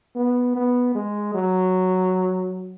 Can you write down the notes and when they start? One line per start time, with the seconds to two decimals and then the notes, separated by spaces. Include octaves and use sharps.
0.16 B3
0.56 B3
0.95 G#3
1.34 F#3